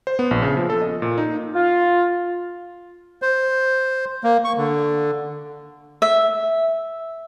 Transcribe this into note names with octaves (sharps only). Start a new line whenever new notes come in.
C5
B3
A#1
C#3
F3
A4
D#5
A#2
D#4
F4
C5
A#3
C#6
D3
E5